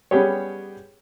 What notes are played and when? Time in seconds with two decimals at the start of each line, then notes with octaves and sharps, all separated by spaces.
0.11 G3 B3 C#4 G4 G#4 C#5